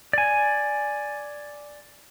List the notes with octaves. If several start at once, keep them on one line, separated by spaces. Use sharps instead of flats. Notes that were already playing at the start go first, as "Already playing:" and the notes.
D5 G#5